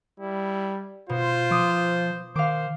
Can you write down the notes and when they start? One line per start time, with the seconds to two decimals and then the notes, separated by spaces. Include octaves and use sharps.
0.20 G3 E4
1.09 B2 F4 C5
1.51 F3 C6 D6 D#6
2.36 D#3 C5 F5 D6